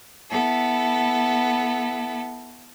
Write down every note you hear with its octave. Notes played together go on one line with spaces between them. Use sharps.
B3 E4 A4